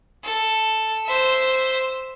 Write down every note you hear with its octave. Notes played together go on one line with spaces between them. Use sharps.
A4
C5 E5